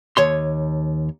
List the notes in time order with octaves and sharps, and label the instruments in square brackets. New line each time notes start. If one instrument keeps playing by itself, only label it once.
[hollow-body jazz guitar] D#2 C#5 C6